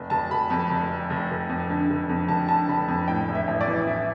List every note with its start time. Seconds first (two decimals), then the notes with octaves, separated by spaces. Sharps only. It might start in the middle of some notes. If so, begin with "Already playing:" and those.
Already playing: F1
0.10 F1 A5
0.31 F1 B5
0.50 F2 A5
0.70 F1
0.90 F1
1.10 F1
1.30 F1
1.49 F2
1.70 D3
1.90 F1
2.09 F2
2.28 F1 A5
2.48 D3 A5
2.68 F1 B5
2.88 F2 A5
3.08 A2 G5
3.28 A1
3.35 E5
3.48 A1
3.61 D5
3.68 E3
3.87 E3 E5